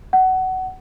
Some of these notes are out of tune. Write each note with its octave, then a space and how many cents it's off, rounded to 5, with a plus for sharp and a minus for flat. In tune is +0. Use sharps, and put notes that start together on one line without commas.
F#5 +20